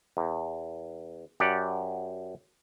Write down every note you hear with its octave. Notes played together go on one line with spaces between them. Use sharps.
E2
F#2 G4 D5 F#5